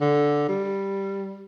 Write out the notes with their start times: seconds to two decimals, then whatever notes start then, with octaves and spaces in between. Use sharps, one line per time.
0.01 D3
0.48 G3